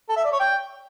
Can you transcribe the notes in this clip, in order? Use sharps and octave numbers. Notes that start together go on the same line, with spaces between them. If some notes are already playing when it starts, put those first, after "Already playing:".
A4
E5
D5
C#5
G5